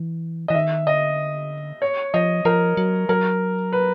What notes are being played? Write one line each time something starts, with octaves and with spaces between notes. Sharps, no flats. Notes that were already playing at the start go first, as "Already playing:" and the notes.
Already playing: E3
E3 D#5
D#3 E5
D3 D#5
C#5
F3 D#5
F3 A#4
F#3
F#3 A#4
B4